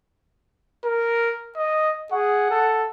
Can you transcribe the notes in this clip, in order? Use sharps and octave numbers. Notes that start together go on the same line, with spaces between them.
A#4
D#5
G#4 F#5
A4